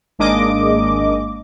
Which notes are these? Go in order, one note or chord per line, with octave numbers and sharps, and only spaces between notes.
G#1 G#3 A#3 D4 D#5 D6